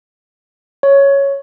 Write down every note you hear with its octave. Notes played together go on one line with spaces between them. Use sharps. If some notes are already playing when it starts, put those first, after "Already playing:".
C#5